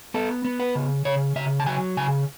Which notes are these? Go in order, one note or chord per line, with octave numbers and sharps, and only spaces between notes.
B3 A4
B3
B4
C#3
C#3 C#5
C#3 E5
A5
F#3 G#5
C#3 G#5